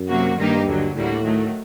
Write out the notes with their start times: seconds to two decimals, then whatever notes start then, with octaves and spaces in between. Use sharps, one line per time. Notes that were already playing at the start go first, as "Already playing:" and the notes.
Already playing: F#2
0.09 C3 F#3 A#3 F#4
0.38 G2 D#3 G3 A#3 D#4 G4
0.67 D#2 D3 F#3
0.95 D2 A2 D3 G3 A#3 F#4
1.24 D#3 F#3 A3